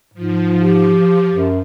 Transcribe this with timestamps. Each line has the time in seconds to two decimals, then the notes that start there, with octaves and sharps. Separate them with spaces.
0.14 G#2 F3
0.61 G4
1.30 F#2